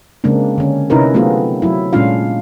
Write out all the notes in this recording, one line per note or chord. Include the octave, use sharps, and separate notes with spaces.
C#3 G#3 A#3 C4 D4
D3 C#4
C3 C#4 D#4 E4 A#4 B4
F#3 A3 B3 C4 F4 G#4
F#3 E4
A#2 G#3 C#4 D4 F4 F5